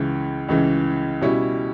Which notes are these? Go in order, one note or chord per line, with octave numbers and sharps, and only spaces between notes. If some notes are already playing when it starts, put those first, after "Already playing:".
Already playing: C#2 C#3 E3
C#2 C#3 E3
B2 G3 C#4 E4